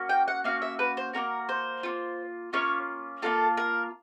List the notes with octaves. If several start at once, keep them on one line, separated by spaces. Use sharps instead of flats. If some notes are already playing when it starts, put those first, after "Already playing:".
Already playing: A#3 C#4 F#4
G5
F#5
A#3 C#4 F#4 F5
E5
B4
C5
A#3 C#4 F#4 A#4
C5
A#3 C#4 F4
A#3 C#4 F4 C#5
A#3 C#4 F4 A4
A#4